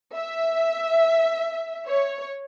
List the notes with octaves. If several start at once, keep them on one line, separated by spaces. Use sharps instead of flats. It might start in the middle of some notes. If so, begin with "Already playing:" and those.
E5
C#5